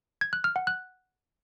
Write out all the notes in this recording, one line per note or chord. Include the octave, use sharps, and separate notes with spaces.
G#6
F#6
F6
F#5
F#6